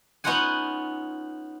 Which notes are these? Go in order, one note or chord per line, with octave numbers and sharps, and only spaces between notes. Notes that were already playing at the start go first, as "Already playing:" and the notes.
B3 C#4 D#4 F4 F#5 G#5